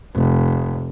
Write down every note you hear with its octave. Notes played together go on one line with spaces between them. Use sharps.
F1